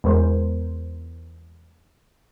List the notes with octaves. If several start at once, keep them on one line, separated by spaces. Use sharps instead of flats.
E2 G#3 A#4 C5